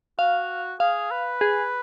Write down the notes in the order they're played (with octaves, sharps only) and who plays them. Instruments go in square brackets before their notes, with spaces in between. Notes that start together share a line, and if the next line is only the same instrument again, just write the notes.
[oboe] F#4 [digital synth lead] F5
[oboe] G#4 [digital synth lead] F5
[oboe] B4
[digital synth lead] G#4